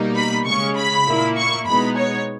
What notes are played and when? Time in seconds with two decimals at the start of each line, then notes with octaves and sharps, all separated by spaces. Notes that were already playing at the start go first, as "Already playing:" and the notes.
Already playing: B2 G3 A#3 D#4
0.16 B5
0.46 C#3 G#3 C#4 C#6
0.77 B5
1.07 A#2 A#3 E4
1.37 C#6
1.67 B2 G#3 B3 D#4 B5
1.97 C#5